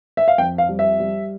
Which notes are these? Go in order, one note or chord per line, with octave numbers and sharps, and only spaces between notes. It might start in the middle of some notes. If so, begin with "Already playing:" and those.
E5
F5
F2 G5
F5
G3
E5
G3